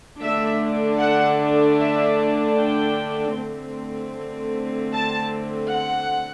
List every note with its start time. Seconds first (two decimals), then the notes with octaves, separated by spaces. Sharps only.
0.22 D3 A3 D4 E5
1.00 F#5
1.79 E5
2.57 G5
3.36 D3 A3 C4
4.92 A5
5.71 F#5